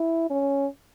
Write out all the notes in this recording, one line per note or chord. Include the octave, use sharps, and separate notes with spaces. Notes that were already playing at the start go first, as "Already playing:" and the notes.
Already playing: E4
C#4